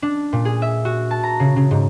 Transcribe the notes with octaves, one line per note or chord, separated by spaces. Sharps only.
D4
A#2
G#4
E5
F#4
A5
A#5
C#3
C#3
G#2